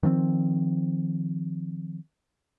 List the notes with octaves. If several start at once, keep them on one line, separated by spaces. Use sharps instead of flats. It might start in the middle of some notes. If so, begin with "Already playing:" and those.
D#3 F3 A#3 C4